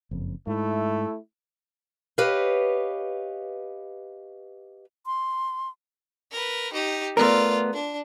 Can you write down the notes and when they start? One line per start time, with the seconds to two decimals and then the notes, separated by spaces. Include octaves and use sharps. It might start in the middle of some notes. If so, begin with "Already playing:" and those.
0.11 F#1 F2
0.47 G#2 A3 E4
2.18 G4 B4 C#5 D#5 F5
5.06 C6
6.32 A#4 B4
6.73 D#4 G4
7.17 A3 B3 F4 A#4 D5
7.74 D4